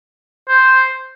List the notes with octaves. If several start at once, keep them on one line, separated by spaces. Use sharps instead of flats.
C5